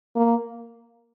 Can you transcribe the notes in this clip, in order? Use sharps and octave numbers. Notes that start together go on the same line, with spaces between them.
A#3